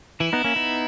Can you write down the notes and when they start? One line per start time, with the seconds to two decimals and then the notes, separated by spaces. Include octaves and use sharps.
0.20 E3 E4
0.33 B3 D#4
0.44 A#3 C#4
0.56 B3 D#4